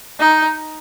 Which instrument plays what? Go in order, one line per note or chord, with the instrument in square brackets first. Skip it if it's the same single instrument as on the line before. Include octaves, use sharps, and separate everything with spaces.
[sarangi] D#4